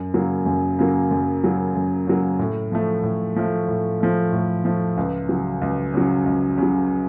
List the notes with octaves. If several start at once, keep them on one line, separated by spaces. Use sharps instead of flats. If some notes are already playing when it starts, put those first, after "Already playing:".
Already playing: F#2
C#3 F#3 A#3
F#2
C#3 F#3 A#3
F#2
C#3 F#3 A#3
F#2
C#3 F#3 A#3
A2
F3 A3
A2
F3 A3
A2
F3 A3
A2
F3 A3
C#2
C#3 F#3
C#2
C#3 F#3
C#2
C#3 F#3